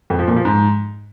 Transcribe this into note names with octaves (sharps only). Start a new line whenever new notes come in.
F2
F3
A#2
F3
G#2